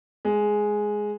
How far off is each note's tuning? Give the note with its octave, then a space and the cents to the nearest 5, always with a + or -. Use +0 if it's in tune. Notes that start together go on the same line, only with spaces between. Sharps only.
G#3 +5